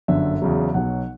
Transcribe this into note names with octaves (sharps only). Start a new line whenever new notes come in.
G1 F#2 D3 E5
E2 C#3 F#3
B1 B2 F#3 F#5